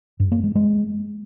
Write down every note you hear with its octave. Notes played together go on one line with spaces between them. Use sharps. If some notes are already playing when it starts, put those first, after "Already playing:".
G2
A#3
G#3
G#3